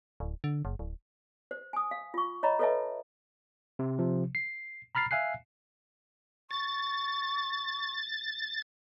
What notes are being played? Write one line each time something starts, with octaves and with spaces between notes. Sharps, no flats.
D1
D3
F#1
D1
C5
G#5 D#6
F5
F4 C#6
C#5 D#5 A#5 B5
A4 B4 C#5 D#5 E5 A5
C3
C3 F3
C7
A#5 B5 F6 A6 C7
E5 F5 G#5 F#6 C7
C#6 A6